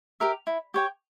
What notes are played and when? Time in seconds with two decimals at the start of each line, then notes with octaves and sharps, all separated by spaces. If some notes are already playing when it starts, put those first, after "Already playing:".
0.20 G4 A#4 E5
0.47 E4
0.74 G4 C#5 G5